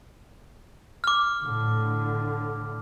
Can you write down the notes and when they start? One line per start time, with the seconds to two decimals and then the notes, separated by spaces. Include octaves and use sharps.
1.04 D6 F6
1.41 A2 D3